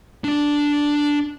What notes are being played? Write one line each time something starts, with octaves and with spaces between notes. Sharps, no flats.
D4 D5